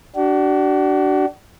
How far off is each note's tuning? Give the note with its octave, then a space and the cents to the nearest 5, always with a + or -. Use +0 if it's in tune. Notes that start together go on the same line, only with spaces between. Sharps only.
D4 +0 F#4 +40